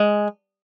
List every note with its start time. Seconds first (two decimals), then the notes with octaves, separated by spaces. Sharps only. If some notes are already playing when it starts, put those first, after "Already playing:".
Already playing: G#3